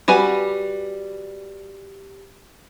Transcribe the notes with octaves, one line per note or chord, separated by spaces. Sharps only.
G3 F#4 B4 G#5